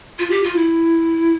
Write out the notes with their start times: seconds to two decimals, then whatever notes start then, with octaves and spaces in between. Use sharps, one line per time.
0.19 F4
0.31 G4
0.43 F4
0.56 E4